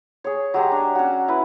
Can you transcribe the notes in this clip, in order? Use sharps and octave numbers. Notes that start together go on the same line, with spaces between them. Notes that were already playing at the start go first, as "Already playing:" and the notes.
G#4 C#5
F#3 G#3 G4 A#5
D4
C#4 F#4
E4 B4